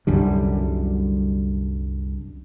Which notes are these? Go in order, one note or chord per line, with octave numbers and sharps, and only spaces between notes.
C2 F#2 D3 G3